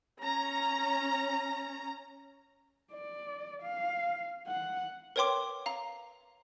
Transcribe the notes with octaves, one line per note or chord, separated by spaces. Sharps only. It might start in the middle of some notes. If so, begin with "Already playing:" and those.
C#4 A#5
D5
F5
F#5
A#4 B4 C#5 G5 C6 D6
F5 A#5